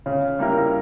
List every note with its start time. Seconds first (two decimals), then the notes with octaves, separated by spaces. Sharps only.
0.06 C#3
0.39 G3 A#3 E4 A#4